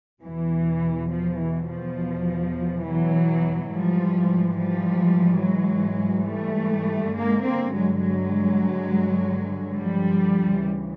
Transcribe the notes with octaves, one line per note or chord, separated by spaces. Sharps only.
E2 B2 E3
F3
E3
F3
E3 F#3
G#2 E3 F3 G3
F3 G3
F#3 G#3
G3 A3
G2 D3 G#3 A#3
A#3 C4
F#3 G#3
F#3 G#3
F3 G3
D2 C#3 E3